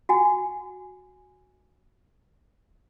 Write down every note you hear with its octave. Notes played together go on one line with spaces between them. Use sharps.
F#4 F#5 G#5